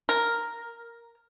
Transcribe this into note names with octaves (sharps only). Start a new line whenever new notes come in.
A#4